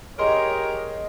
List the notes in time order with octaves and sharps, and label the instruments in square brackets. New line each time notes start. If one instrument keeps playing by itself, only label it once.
[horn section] G4 A#4 C#5 [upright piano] G#4 D#5 C6